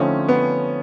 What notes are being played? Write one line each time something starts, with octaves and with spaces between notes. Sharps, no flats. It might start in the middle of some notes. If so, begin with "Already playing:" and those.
Already playing: D3 F3 A3 C4 C#4 D#4
B3